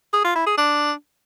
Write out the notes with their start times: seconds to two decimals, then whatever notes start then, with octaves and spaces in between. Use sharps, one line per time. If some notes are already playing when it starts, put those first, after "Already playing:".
0.13 G#4
0.24 F4
0.35 E4
0.47 G#4
0.58 D4